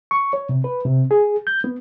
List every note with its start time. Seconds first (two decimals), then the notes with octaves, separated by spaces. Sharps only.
0.11 C#6
0.33 C#5
0.49 C3
0.64 B4
0.85 C3
1.11 G#4
1.47 G6
1.64 B3